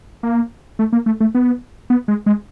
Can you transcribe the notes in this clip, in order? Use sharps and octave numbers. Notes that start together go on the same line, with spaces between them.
A#3
A3
A#3
A3
A3
B3
B3
G#3
G#3